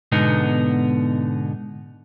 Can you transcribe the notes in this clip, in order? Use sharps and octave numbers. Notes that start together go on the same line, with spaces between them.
G#2 B2 D3 B3 D#4